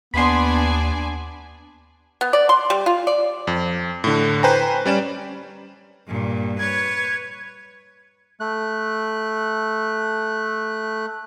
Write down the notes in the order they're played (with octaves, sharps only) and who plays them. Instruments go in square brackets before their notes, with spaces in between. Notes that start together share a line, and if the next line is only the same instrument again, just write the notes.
[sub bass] D#2 [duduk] B3 [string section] D4 G#5 [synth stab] B5 C6
[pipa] B3
D5
C6
G3
F4
D5
[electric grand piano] F2
A2 D3
B4 C5 G5 G#5 A#5
G3 C#4 D5 E7
[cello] G2 A#2
[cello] B4 C#5 [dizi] G#6
[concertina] A3 F#6